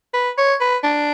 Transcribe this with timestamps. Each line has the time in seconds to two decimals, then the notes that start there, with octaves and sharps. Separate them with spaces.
0.14 B4
0.38 C#5
0.60 B4
0.84 D4